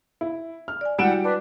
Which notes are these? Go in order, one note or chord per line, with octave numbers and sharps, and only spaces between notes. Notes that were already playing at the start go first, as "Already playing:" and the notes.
E4
F6
D5 G#5
G3 G#3 E4 F#4 F#5 G5 D7 E7
D4 B4